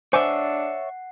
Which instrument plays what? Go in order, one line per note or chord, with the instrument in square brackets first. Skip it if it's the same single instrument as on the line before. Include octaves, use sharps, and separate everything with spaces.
[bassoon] D4 [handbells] C5 G#5 D6 [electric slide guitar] C#5 E5 [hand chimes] F#5 C7